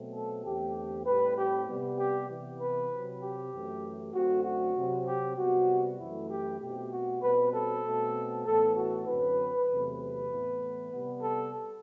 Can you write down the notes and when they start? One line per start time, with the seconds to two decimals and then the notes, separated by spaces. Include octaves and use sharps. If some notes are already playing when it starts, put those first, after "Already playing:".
Already playing: B2 F#3 A3 C4
0.14 A4
0.44 E2 D3 A3 C4 G4
1.06 A2 G3 C4 B4
1.37 G4
1.68 C3 G3 B3
1.98 G4
2.29 C3 E3 B3
2.60 B4
2.91 C3 F#3 C4
3.22 G4
3.53 F#2 E3 A3
4.14 F#2 D3 A3 C4 F#4
4.45 F#4
4.75 C3 F#3 C4
5.06 G4
5.37 C3 G3 B3 F#4
5.99 F#2 E3 A3 E4
6.30 G4
6.61 B2 A3 C4 G4
6.91 F#4
7.22 B2 G3 C4 B4
7.53 A4
7.84 B2 A3 C4
8.45 A2 E3 B3 A4
8.76 F#4
9.07 F#2 D3 F#3 C4 B4
9.68 E2 C3 F#3 A3 C4
10.00 B4
10.30 A2 E3 B3
10.92 C3 G3 B3
11.22 A4